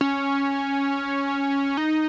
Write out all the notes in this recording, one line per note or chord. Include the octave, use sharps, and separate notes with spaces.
C#4
D#4